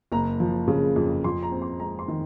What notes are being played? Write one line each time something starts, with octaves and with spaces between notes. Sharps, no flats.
F#1 A#5
F3
C#3
F2
F2 C6
A#5
C4
C6
G#3 A#5
C6
D#3